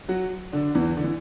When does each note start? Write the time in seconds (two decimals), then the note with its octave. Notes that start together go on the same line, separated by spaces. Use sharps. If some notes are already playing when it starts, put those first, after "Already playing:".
0.09 F#3 F#4
0.53 D3 D4
0.75 E2 E3
0.97 D3
1.04 E3